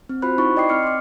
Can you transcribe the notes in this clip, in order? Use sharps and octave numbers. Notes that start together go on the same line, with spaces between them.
C4
F4 F#4 C5 B5 F#6
D#4 E4 B5 C#6
D5 D#5 G5 D6 C7
C4 F6 C#7
C6 D6